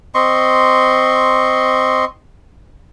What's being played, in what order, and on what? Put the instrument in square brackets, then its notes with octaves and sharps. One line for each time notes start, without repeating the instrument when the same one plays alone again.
[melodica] C4 D#5 C6 C#6